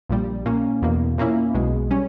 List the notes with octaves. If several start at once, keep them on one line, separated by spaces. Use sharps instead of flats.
A#1 A#2 G3
A#2 A#3 C#4
E2 B2 A#3
A#2 A#3 C#4 E4
B1 B2 G#3
G3 C#4